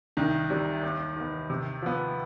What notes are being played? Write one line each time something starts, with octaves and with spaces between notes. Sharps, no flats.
C2 D#3
C3 G3
D#2
D#3 B3
C3
F3 B3